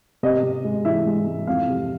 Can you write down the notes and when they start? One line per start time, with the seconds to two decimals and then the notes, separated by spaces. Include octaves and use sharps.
0.23 C3 D#5
0.43 C3
0.65 G#3
0.85 E3 E5
1.06 G#3
1.27 G#3
1.47 F2 F5
1.68 C3